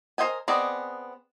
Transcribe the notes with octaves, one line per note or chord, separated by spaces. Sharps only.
A#4 C5 D#5 G5 G#5
B3 C4 G#4 D5 D#5